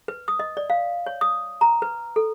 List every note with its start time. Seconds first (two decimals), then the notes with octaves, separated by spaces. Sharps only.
0.08 B4
0.28 D#6
0.39 D#5
0.57 D5
0.70 F5
1.06 C#5
1.21 D#6
1.61 A#5
1.82 B4
2.16 A4